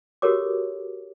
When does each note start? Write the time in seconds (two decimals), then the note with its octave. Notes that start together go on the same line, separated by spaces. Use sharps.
0.22 F#4 G4 A4 A#4 C#5 D6